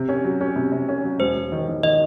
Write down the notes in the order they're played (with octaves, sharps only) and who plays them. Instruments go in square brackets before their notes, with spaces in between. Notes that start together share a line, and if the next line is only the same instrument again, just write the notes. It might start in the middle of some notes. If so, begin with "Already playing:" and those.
Already playing: [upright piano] C3
C#4
F#3
C#4
C3
C3
C#4
F#3
[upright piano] E1 [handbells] C5
[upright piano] E1
D#3
D#3
[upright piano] D#3 [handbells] D#5